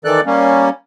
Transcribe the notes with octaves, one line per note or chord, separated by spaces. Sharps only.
D#3 E3 A4 D5 F#6
G3 A#3 C#4